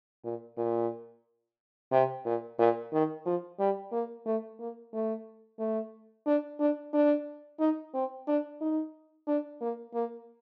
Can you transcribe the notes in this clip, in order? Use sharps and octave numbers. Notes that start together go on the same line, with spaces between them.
A#2
A#2
C3
A#2
A#2
D#3
F3
G3
A#3
A3
A#3
A3
A3
D4
D4
D4
D#4
C4
D4
D#4
D4
A#3
A#3